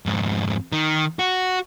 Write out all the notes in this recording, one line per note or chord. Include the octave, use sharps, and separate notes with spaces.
F2 G#2
D#3
F#4